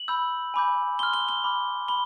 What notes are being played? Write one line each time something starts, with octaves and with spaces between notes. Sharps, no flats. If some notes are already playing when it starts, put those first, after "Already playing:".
Already playing: F#7
B5 E6 G6
G#5 B5 D6 G6
C6 F6 G7
G7
G7
B5 D6 F6
B5 G7